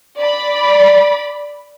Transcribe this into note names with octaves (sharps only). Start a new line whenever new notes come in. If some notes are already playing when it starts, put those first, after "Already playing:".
D5 B5